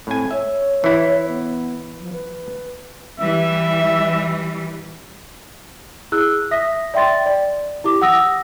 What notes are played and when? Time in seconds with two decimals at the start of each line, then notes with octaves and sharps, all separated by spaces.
0.07 A2 C4 G#5
0.31 C#5 E5
0.84 E3 E4
1.29 B3
2.01 F3
2.13 B4
3.20 E3 G3 E5
6.12 E4 G#4 E6 F#6
6.51 E5 D#6 A#6 B6
6.94 D5 E5 G5 C6 A6
7.26 D5
7.84 E4 G4 D6
8.02 F#5 D#6 E6 A#6